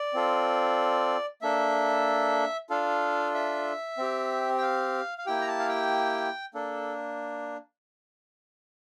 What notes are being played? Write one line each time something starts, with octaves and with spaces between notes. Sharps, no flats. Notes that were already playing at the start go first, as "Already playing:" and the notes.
Already playing: D5
C4 F4 A4
A#3 D4 A4 E5
D4 F4 A4 F5
E5
C4 G4
G5
F5
F5
A#3 E4 G4 G5
A#5
A5
F5
G5
A#3 D4 A4